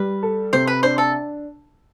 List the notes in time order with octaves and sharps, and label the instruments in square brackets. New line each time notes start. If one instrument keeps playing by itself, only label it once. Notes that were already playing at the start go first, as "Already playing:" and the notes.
Already playing: [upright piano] G3 [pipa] B4
[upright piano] A4
[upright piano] C3 [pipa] C5
[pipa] B4
[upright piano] D4 [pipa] C5
[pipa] A4